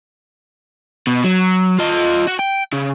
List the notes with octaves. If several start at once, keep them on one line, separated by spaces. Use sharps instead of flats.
B2
F#3
F4 D#5
F#4
G5
C#3